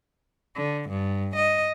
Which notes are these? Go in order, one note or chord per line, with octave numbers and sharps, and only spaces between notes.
D3
G2
D#5